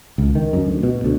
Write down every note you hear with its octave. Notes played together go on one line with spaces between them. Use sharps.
C#2
D#3
F#2
D2
B2
D2